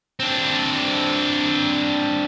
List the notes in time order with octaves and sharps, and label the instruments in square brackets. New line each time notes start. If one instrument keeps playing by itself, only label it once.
[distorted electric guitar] C4 D4